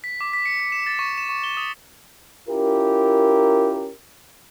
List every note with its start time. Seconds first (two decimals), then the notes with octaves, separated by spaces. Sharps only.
0.04 B6
0.21 D6
0.33 B6
0.45 C#7
0.60 B6
0.72 E7
0.86 A6
0.99 C#6
1.18 E7
1.29 C#6
1.44 G7
1.57 D#6
2.48 C#4 E4 F4 G4 A#4